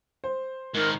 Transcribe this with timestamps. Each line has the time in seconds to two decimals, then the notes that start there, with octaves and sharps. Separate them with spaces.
0.24 C5
0.74 G#2 D#3 A#4